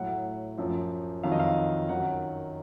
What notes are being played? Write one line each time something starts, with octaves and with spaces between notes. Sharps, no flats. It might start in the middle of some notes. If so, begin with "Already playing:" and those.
Already playing: A2 F#3 F#5
F#2 F3
F2 D#3 F#3 F5
D#5
F5
F#2 D#3 F#3 F#5